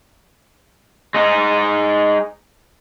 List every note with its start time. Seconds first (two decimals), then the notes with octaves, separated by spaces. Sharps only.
1.14 G#3 D#4